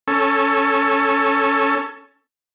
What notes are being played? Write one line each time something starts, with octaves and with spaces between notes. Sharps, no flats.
C#4 A4